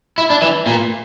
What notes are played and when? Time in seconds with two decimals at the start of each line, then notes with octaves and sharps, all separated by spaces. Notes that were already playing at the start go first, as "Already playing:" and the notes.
0.18 E4
0.30 D4
0.42 E3
0.67 A#2